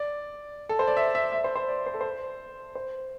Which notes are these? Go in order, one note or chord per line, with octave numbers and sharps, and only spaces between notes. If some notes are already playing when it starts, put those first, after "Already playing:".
Already playing: D5
A4
C5
D5
E5
E5
E5
C5
C5
D5
C5
A4
C5
C5